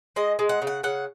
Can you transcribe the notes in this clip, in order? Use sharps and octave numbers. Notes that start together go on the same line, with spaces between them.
G#3 D#5
G#3
F#5
C#3
F#5
C#3 F#5